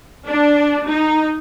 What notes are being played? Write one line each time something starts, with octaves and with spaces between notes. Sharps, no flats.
D4
D#4